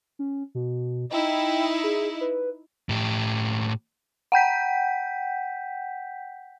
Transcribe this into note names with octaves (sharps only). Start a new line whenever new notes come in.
C#4
B2
D#4 E4 G5
G#4
B4
A2 G4
F#5 G5 G6 B6